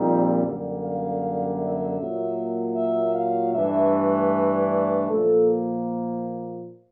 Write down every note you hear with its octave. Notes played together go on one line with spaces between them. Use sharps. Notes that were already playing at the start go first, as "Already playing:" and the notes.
Already playing: A#1 A#2 G3 C4 D#4
F#2 D3 G3 A#3
F5
E5
A#2 F#3 A#3
E5
F5
G2 E3 A3 D4 E5
D5
A#2 F3 A#3 A4